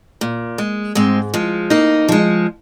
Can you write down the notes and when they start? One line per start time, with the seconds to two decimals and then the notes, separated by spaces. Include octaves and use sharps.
0.21 A#2
0.58 G#3
0.95 G#2 G#3 C4
1.34 F3 G#3
1.70 F2 A#3 D#4
2.08 F3 G#3